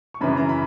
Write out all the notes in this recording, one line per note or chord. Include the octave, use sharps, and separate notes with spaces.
C#6
F#2 C#3 E3 B5
A#5
B5